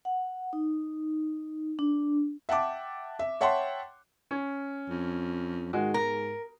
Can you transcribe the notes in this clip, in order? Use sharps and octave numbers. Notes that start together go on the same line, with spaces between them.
F#5
D#4
D4
E5 F#5 G5 A5 D6
E5
C#5 E5 F#5 G5 A5 C6
C#4
F2
G#2 D#3 G#3 F#4
A#4 A#5